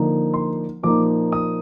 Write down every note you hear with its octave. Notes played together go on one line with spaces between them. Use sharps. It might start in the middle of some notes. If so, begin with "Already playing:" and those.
Already playing: D3 F3 A#3 D#4
C6
A#2 F3 A#3 D#4 D6
D#6